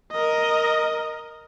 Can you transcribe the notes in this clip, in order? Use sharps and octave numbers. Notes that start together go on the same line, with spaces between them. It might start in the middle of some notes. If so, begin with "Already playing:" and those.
A#4 D#5